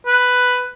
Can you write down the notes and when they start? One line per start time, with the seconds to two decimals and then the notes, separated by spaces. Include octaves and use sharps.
0.07 B4